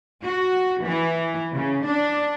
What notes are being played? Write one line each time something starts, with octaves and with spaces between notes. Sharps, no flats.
F#4
E3
C#3
D4